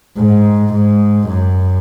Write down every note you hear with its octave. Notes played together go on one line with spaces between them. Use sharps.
G#2
G#2
F#2